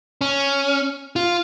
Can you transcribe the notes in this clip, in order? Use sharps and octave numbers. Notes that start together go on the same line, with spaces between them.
C#4
F4